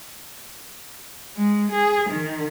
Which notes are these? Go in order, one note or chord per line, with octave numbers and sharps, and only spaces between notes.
G#3
G#4
D#3